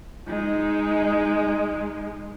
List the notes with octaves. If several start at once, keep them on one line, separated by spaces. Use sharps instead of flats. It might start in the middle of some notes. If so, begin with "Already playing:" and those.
G#3 D#4